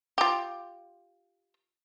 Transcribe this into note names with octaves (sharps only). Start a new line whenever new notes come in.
F4 G4